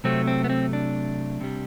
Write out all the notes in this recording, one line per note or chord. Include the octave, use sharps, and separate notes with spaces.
C3 F#3 A3 C4
C4
B3
C4
D4
C3 G3